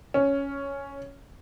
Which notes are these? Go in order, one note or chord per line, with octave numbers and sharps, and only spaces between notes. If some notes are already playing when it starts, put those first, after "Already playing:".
C#4